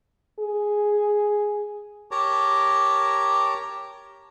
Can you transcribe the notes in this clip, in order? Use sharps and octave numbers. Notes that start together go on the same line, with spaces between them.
G#4
G4 A#4 C#5 A5 A#5